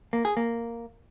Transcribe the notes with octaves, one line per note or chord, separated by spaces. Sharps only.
A#3
G#4
A#3